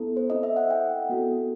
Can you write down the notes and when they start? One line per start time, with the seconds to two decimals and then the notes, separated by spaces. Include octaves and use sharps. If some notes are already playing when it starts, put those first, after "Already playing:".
Already playing: B3 E4 A4
0.17 C5
0.30 C4 E4 A4 D#5
0.43 E5
0.57 F#5
0.70 G5
1.09 B3 F#4 A4